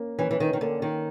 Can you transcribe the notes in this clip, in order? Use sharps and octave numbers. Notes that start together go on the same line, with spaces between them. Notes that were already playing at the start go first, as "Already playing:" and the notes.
Already playing: A#3 C#4
E3 C#4
E3
D#3
D#3
D3 A#3
D#3